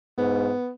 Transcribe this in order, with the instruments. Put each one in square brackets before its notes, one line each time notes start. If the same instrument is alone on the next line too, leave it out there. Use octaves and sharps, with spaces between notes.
[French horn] G#2 [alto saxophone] B3